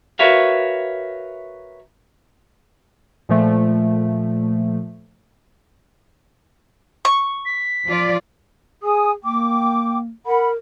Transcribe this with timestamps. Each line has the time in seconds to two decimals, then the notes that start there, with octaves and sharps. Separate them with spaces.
0.19 F#4 A#4 B4 C#5 E5 F5
3.29 A#2 F3 A3
7.05 C#6
7.45 B6
7.86 F3 F4 D5
8.83 G#4 G#5 D#6
9.23 A#3 G5 D6
10.26 A#4 F#5 B5